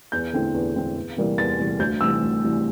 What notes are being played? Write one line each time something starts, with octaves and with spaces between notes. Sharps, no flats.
E2 G6
D3 A3 C4 E4
E2
D3 A3 C4 E4
E2
C3 E3 G3 A#3
E2 A6
C3 E3 G3 A#3
D2 G6
C3 E3 G3 E6
D2
C3 E3 G3